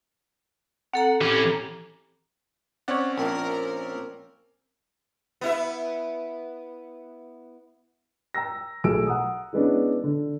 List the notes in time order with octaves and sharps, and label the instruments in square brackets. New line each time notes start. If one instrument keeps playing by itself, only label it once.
[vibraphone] C4 A4 A#5 [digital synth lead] F#5
[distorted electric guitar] E3 C#4 [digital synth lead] G4
[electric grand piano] C4 C#4 D5 [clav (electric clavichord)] C#5 F#5
[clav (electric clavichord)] A#1 A#2 [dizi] A#4
[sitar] B3 E4 E5
[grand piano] G5 A#5 E6 A#6
B1 A3 G#4 E6 D7
F#5 A#5 D#6
E3 G#3 B3 C#4 D4
D3